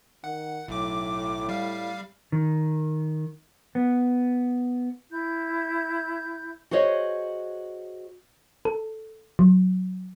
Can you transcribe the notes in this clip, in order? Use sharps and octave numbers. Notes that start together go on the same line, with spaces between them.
D#3 F#5
B1 A2 D6
G3 F5
D#3
B3
E4 G6
F#4 G#4 C5 C#5 D#5
A4
F#3